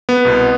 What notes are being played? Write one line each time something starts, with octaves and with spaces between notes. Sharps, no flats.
B3
C2 B2